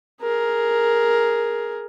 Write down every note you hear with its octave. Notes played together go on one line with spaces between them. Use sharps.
G#4 A#4